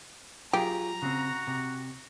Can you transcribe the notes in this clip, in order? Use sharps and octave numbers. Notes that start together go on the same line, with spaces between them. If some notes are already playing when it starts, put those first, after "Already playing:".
F#3 F4 G4 G#4 A#5
C#3 C4 F#4
C3